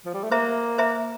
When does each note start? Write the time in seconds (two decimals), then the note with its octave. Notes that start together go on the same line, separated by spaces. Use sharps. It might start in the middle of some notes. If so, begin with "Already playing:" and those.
0.06 F3
0.14 G3
0.23 A3
0.31 A#3 C5 E5 A#5
0.78 C5 E5 A#5